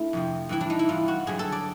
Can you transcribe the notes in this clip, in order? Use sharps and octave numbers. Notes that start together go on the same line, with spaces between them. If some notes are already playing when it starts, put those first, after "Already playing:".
Already playing: A3 D4 E4
F2 C3 F3
G2 E3 E4
D4
D#4
E4
G2 E3 F4
F#4
G2 D3 F#3 G#4
A4
D5